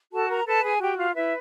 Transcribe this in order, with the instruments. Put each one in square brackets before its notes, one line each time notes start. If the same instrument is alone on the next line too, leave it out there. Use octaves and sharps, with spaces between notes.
[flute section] F#4 A4 A5
A#4 A#5
A4 B4 A5
G#4 G#5
F#4 G4 G5
F4 F5
E4 B4 E5